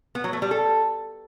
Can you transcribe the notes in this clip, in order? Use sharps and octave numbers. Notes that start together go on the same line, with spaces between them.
B3
F#3
A3
G3
A4